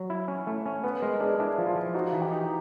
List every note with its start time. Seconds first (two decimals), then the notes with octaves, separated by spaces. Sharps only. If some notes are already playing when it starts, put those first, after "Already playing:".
Already playing: F#3
0.10 E4
0.28 C#4
0.47 A3
0.66 C#4
0.84 B3 B4
1.02 G#3 A#4
1.20 D4 G#4
1.39 D4 E4
1.58 F3
1.67 F4
1.75 F3
1.95 D#4 F#4
2.13 E3
2.22 G4
2.31 D#4